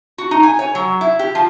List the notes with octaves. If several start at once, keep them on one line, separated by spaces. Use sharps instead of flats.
F#4
D#4
G#5
C#5
F#3
E4
G4
F3